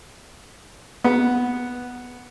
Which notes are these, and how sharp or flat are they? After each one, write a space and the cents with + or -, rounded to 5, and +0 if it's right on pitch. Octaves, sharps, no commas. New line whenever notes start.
B3 -5